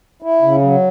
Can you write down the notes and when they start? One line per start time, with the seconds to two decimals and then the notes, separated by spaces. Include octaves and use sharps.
0.22 E4
0.42 C#3
0.62 F#3